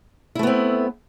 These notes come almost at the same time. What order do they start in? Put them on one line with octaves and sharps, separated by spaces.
E4 A3 B3 C4